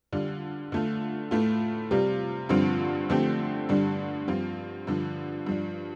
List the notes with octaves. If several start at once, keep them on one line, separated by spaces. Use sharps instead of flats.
D3 G3 F4
D3 A3 F4
A2 A3 F4
C3 G3 F4
G2 D3 F3 C4 F4
D3 F3 A3 C4 G4
G2 D3 G3 D4
G2 F3 C4 F4
G2 D3 F3
G2 F3 D4